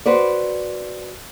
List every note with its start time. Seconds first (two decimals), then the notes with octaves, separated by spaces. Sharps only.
0.06 F#4 B4 C5 D5